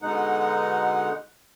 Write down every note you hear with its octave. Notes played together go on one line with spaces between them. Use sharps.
B2 D3 G#3 D#4 F#5